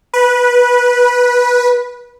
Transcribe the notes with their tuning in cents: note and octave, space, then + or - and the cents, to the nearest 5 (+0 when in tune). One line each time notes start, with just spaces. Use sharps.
B4 -15